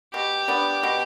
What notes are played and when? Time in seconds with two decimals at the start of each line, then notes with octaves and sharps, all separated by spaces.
0.13 B2 G4
0.48 B3 D4
0.83 B2